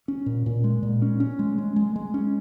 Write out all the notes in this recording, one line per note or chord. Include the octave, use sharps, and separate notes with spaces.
C#4
A#2
A#2
G#3
A#2
C#4
C#4
G#3
G#3
G#3
G#3
C#4